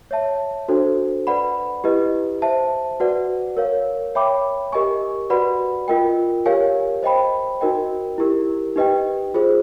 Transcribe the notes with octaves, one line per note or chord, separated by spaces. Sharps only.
C#5 E5 A5
D4 F#4 A4 C5
B4 D5 F#5 B5
E4 G4 B4 D#5
C5 E5 A5
F#4 B4 D5 F#5
A#4 C#5 F5
C#5 E5 G5 B5 D6
G4 A#4 D#5 G#5 C#6
F#4 B4 D5 F#5 B5
F4 A#4 D#5 G5
G4 A#4 C#5 F5 G#5
C5 D#5 G5 B5
D#4 F#4 A#4 D#5 G5
E4 G4 A#4
D#4 G4 B4 D#5 G5
F4 G#4 C5